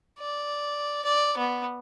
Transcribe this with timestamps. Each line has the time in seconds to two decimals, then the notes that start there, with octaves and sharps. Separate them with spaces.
0.19 D5
1.05 D5
1.38 B3